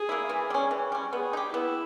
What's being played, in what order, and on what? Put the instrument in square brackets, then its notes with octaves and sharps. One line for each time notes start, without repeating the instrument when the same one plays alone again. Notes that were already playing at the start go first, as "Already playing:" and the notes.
Already playing: [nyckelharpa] G#4
[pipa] A#3 E4
E3
G3 C#4
E3
G3 C#4
[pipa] B3 [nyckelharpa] G#4
[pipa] D#4
G4
[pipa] B3 [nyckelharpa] E4